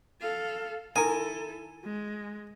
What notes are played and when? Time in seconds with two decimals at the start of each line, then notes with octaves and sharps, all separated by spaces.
0.21 A4 F5
0.96 D#3 E4 A4 A#4 G#5
1.84 G#3